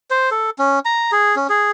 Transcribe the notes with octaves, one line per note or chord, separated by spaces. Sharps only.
C5
A4
C#4
A#5
G#4
C#4
G#4